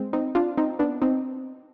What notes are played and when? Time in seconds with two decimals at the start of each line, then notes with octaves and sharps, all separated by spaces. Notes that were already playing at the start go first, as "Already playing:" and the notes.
Already playing: G#3 C4
0.13 C4 D#4
0.35 D4 F4
0.57 C4 D#4
0.79 B3 D4
1.02 C4 D#4